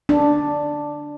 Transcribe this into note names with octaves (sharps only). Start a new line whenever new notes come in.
D4